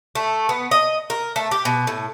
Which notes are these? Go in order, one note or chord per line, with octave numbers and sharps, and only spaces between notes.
A3
B3
D#5
A#4
A3
G4
B2
A2